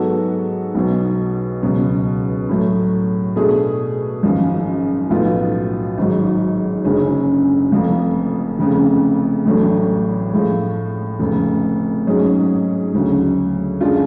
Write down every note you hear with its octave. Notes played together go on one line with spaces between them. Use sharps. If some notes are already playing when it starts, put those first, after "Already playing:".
Already playing: G#2 F#3 B3 F#4 A4
B1 B2 F#3
C#2 B2 F#3
A2 F#3 A3
B2 A3 D4 G#4
G#1 F#2 F3
B1 A2 F3 B3 F4
G#1 G#2 F#3
F#1 F#2 D3 G#3 C#4
F1 F2 F3
F1 F2 C#3
A1 A2 F#3 A3 D4
A2 F3 G#3
F1 F2 C#3
G#2 F#3 C#4 G#4
D2 C#3 F#3
F#2 D3 G#3 D4 F4